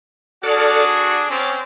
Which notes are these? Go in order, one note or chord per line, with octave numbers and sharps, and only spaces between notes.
D4 F#4 G#4 A4 D5 F6
C#6
C4 C#4 A5 D6